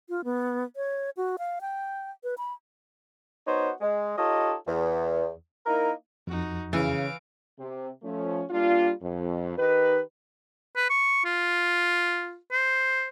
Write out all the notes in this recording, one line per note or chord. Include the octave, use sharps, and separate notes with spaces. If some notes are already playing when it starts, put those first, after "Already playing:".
F4
B3
C#5
F#4
F5
G5
B4
B5
B3 D#4 F#4 C5 C#5
G#3
D#4 F4 G4 A4 C#5 D#5
E2
A#3 D#4 E4 A#4
F2 D#4 F#4
C#3 E3 F5 D7
C3
F3 A3 C#4
G3 A#3 D4 F4
F2
D#3 D#4 G4 B4
B4
C#6
F4
C5